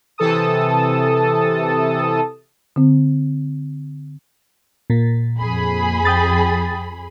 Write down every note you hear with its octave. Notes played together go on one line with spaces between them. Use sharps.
C3 E3 A4 A5 D#6
D3 C4
A#2 A#3
F2 G#4 B5
G5 D#6 A6